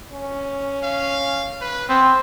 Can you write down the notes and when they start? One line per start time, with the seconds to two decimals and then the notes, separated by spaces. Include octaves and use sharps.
0.12 C#4
0.83 F5
1.61 B4
1.89 B3 C4